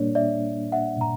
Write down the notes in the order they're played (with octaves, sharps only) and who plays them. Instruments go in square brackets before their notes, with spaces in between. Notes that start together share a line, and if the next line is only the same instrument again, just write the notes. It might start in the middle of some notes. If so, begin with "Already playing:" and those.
Already playing: [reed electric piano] A#2 G3 A#3 D4 [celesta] C#5
[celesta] D5 E5
E5 F#5
A#5